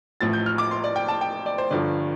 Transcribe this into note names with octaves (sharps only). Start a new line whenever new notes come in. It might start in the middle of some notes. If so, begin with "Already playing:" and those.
A1 A2 F3 A6
G6
F6
D6
C6
D5
G5
A5
G5
D5
C5
G1 G2 D3 F3 D5